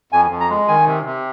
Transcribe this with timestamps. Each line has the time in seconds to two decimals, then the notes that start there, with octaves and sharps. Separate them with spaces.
0.12 F2 G#5
0.31 F2
0.40 A#5
0.50 G#3
0.68 D#3 G#5
0.86 C3
1.05 C3